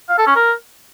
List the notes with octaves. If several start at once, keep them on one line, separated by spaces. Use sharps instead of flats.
F5
A4
C#4
A#4